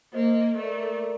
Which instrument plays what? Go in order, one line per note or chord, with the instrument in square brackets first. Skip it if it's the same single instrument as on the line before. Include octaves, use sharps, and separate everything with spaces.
[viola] A#3 [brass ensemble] C5 D#5
[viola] A3 [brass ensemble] A#4 D5